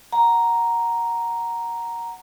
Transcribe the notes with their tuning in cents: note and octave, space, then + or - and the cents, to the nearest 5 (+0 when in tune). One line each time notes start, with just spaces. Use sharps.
F#5 +0 A#5 +0